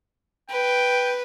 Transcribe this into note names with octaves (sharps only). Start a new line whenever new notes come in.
B4 G5